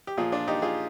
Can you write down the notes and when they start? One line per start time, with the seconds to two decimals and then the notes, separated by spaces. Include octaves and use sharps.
0.07 G4
0.17 A#2 F3 F4 G#4
0.32 D4 F4
0.48 D#4 G4
0.62 F4 G#4